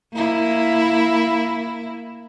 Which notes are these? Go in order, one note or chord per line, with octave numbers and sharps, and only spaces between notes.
A#3 E4